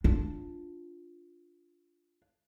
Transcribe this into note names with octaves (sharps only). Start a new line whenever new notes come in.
D4 F4